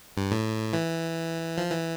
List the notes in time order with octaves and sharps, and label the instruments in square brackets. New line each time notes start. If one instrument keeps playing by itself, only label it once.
[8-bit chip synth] G2
A2
E3
F3
E3